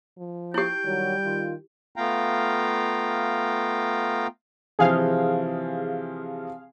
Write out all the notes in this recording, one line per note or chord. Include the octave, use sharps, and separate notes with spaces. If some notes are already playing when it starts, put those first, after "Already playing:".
F3
E4 G4 G5
D#3 F#3 G3
D#3 F4
A3 B3 F4 F5 G5 A#5
C3 E3 F3 G#4 F5